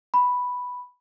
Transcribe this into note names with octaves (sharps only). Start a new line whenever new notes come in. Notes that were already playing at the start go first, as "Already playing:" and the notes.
B5